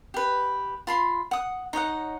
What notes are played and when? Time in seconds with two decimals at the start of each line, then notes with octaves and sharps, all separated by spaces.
0.14 G4 B4
0.87 F4 B5 C6
1.31 F#5 D#6
1.73 D#4 C#5 D#5 F#5